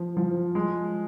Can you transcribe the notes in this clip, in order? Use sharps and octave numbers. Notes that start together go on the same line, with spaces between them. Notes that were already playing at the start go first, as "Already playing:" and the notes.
Already playing: F3
F3
G#3